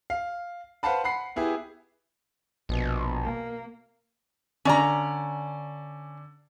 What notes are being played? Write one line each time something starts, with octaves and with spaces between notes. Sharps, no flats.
F5
B4 C5 F5 F#5 A5 B5
F#5 B5 C7
B3 E4 G4 G#4
A#1 B2
A#3
D3 C#4 D5 A#5